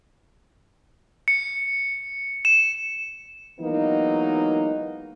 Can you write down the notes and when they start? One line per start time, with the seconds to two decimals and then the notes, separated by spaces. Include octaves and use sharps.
1.28 C#7
2.45 E7
3.60 E3 F#3 G#3 A#3 B3 D#4